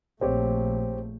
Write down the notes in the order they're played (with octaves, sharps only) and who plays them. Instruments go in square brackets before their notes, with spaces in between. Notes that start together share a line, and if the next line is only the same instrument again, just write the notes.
[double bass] A#1 A3 [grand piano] C4 G4 C#5